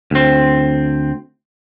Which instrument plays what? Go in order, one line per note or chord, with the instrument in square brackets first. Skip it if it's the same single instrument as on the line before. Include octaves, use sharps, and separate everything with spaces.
[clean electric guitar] D2 C4